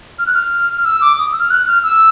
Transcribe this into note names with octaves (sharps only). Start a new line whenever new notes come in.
F6
F#6
F6
F6
E6
D6
D#6
E6
F6
F#6
F6
E6